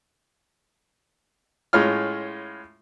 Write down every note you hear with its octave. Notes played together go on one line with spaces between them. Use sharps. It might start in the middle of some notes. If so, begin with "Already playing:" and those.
A2 G#3 C#4 F4 F6